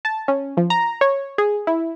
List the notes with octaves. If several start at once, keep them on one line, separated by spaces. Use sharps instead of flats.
A5
C#4
F3
A#5
C#5
G#4
E4